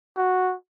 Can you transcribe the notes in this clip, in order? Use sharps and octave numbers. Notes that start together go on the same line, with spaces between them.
F#4